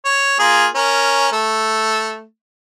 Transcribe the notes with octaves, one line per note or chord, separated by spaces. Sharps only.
C#5
A#3 F4 G#4
C#4 A#4
A3